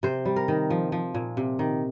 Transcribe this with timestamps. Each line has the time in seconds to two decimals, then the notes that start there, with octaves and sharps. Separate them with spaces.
0.03 C3 C5
0.25 G3
0.36 A#4
0.48 D#3
0.70 F3
0.92 F3
1.14 A#2
1.37 C3
1.59 D#3